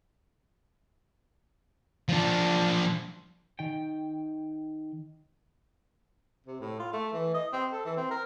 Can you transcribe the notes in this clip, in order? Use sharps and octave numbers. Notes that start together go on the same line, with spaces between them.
F3 D4
D#3 G5
C3
A2
F4
A3
E3
D#5
C4
A4
E3
C4
A#4